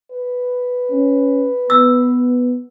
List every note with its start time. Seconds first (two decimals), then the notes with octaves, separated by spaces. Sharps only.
0.11 B4
0.90 C#4
1.70 B3 E6